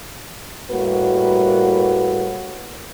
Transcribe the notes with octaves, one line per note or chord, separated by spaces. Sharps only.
A2 G3 A#3 F#4 B4